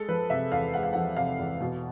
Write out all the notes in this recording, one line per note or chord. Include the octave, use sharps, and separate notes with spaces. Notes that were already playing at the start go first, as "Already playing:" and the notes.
Already playing: G#3 A4
F3 B4
C3 E5
E2 F5
G#3 F#5
F5
F3 F#5
C3 F5
E2
B2